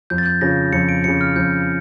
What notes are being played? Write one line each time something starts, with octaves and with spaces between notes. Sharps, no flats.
F2 G6
A6
G6
C#3 F3 A#6
F2 C#7
D7
C#3 F3 C#7
F6
F2 G6